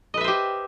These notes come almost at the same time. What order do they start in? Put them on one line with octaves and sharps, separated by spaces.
D#5 B4 E5 C5 G4